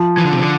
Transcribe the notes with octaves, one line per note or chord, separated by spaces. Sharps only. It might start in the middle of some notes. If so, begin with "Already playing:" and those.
Already playing: F3
E3
D3
C3
D3